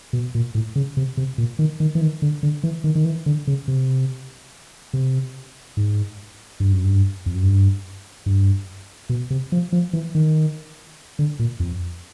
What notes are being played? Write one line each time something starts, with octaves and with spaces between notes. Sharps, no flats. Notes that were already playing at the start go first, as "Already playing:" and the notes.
B2
A#2
A2
C#3
C3
C3
A#2
D#3
D#3
E3
D#3
D3
D3
E3
D#3
D#3
E3
D3
C#3
C3
C3
G#2
G2
F#2
G2
F2
F#2
G2
G2
B2
C3
F3
F3
E3
D#3
D3
A#2
F2